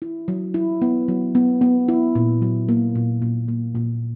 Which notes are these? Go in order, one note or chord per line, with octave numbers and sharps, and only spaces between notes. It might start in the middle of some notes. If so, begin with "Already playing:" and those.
E4
F#3
E4
B3
F#3
B3
B3
E4
A#2
F#3
A#3
A#2
A#2
A#3
A#2